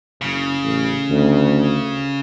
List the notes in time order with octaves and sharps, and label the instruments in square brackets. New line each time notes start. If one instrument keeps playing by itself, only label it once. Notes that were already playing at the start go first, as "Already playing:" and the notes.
[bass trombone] F#1 [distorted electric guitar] C#3
[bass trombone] A1
D2